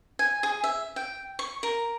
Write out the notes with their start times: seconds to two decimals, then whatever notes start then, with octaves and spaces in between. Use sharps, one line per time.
0.19 G#5
0.43 G#4
0.64 E5
0.96 G5
1.39 C#6
1.63 A#4